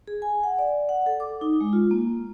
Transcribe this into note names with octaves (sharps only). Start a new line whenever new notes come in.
G#4
G#5
F#5
D5
F#5
A4
D6
D#4
G#3
F4
A#3